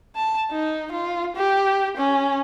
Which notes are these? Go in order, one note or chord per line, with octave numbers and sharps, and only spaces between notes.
A5
D#4
F4
G4
C#4